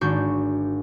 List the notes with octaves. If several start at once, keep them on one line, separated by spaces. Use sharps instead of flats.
G#1 D4 F#4 C#6 G6